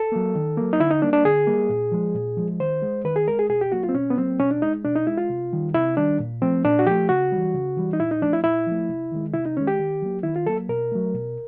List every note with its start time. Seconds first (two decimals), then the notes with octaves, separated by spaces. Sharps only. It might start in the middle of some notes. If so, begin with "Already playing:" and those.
Already playing: A4
0.12 F#3 A#3
0.35 D#3
0.57 F#3 A#3
0.73 D#4
0.80 D3 E4
0.90 D#4
1.02 G3 A#3 D4
1.13 D4
1.25 D3 G#4
1.47 G3 A#3
1.69 A#2
1.92 F3 G#3
2.14 A#2
2.37 F3 G#3
2.60 D#3 C5
2.82 G#3
3.05 D#3 B4
3.16 G#4
3.27 G#3 A#4
3.39 G#4
3.49 B2 G#4
3.61 G4
3.72 F#3 A#3 F#4
3.83 F4
3.89 C4
3.95 B2 C#4
4.10 B3
4.18 F#3 A#3 C4
4.39 B2 C#4
4.51 D4
4.62 G#3 D#4
4.84 B2 D4
4.95 D#4
5.07 G#3 E4
5.18 F4
5.30 C3
5.52 D#3 G3
5.74 C3 E4
5.97 D#3 G3 D4
6.19 A#2
6.42 F3 A3 C4
6.65 A#2 D4
6.79 F#4
6.86 F3 A3 G4
7.09 C#3 F#4
7.32 E3 G3
7.54 C#3
7.77 E3 G3
7.93 D#4
8.00 A#2 E4
8.11 D#4
8.21 F3 A3 D4
8.33 E4
8.44 A#2 E4
8.67 F3 A3
8.89 C3
9.12 D#3 G#3
9.34 C3 E4
9.46 D#4
9.57 D#3 G#3 C#4
9.67 G4
9.79 D#3
10.02 F#3 A#3
10.23 D#3 E4
10.36 F4
10.46 F#3 A#3 A4
10.69 B2 A#4
10.92 F#3 A3
11.14 B2